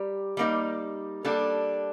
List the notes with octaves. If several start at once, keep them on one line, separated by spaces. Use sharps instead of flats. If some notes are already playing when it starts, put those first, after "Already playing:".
Already playing: G3 G4 A#4
G3 A#3 D#4
G3 A#3 D4 A4